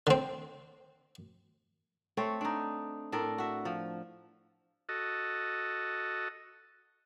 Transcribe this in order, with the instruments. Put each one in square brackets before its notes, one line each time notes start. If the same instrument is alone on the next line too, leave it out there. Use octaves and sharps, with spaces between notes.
[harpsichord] D3 C4
[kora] A3 C4 C#5
D4 D#4
A2 D4 A4 A#4
F#4 E5
F3
[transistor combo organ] F#4 A4 D#5